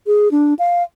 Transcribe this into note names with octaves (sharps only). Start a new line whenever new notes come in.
G#4
D4
F5